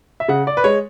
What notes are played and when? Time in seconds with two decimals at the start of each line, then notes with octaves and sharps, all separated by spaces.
0.20 E5
0.28 C#3 F#5
0.47 D5
0.57 B4
0.64 G#3 C#5